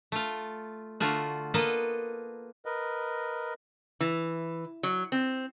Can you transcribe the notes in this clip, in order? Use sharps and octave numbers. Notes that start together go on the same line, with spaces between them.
A3 F4
D3 A3 F4 F#4
A#3 B3 A4 B4 D#5
A#4 B4 D#5
E3
F#3
C4